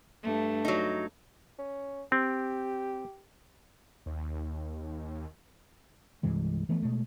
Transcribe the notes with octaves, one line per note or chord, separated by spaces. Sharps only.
G2 A3
F#3 D#4
C#4
C4 G4
D#2
C2 G2 E3 G#3
E3 F3 A3 B3
B2 G#3 A3